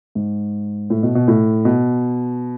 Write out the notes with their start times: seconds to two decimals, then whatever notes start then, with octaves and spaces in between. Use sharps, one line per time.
0.15 G#2
0.90 A2
1.03 B2
1.15 B2
1.28 A2
1.65 B2